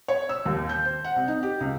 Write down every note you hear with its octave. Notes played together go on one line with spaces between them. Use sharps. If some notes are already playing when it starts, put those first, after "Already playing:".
C#5
E6
D#2
G6
C5
F#5
C2
D#4
G4
C#2